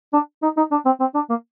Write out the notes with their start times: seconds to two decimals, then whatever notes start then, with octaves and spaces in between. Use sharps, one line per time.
0.13 D4
0.42 D#4
0.57 D#4
0.71 D4
0.85 C4
1.00 C4
1.14 D4
1.29 A#3